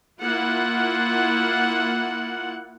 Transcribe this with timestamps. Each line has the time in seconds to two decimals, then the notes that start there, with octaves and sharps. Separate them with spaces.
0.22 A#3 E4 F4 F#5